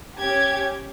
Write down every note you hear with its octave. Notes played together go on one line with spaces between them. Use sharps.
C#4 G4 G#6